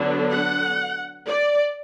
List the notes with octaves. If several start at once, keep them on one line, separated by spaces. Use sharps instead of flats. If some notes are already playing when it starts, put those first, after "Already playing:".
Already playing: D3 F#3 B3 D4
F#5
D5